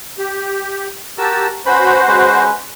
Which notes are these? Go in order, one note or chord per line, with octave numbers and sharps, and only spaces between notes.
G4
F#4 G4 A#4 A5 E6
C#4 F#4 B4 C5 B5
G#3 C#4 B4